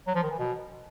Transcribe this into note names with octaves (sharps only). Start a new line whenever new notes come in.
F#3
F3
D#3
E3
B2